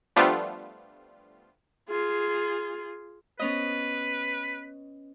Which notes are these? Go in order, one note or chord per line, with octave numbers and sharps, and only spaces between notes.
F3 G3 A3 B3 D4 F4
F4 G#4
B3 C#4 B4 D#5